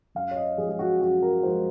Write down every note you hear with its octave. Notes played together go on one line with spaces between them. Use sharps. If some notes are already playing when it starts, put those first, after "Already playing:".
F#2 F5
C#5
D#5
F3 G#3 G#4
G#4
F#4
F#2 F#4
A#4
F3 G#3 C5